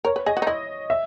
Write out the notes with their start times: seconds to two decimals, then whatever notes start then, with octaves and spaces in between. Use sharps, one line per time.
0.05 A#4 C#5
0.16 B4
0.26 G#4 D#5
0.37 F#4
0.42 D#4
0.47 E4 D#5
0.90 E5